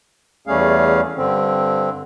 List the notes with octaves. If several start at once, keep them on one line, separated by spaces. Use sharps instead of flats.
E2 G3 A3 C#4 G#4 F5
G2 D3 C4